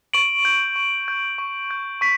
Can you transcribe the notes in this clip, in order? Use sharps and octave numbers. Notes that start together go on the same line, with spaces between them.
C#6 D7 F#7
G6
C#6
G6
C#6
G6
C#6 B6